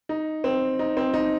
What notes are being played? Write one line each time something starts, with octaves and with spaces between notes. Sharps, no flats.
D#4
C4
D#4
C4
D#4